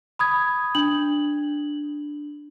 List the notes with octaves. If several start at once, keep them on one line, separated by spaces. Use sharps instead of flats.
B5 D#6 G#6
D4 F#7